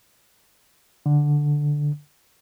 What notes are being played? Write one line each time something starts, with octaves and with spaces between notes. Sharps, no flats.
D3